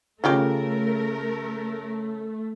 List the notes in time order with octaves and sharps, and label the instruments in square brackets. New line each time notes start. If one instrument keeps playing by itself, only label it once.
[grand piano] C#3 [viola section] A3 [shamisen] C#4 F4 G4 [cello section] A#4